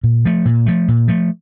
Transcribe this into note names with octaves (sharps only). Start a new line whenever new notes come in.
A#2
F3 A3
A#2
F3 A3
A#2
F3 A3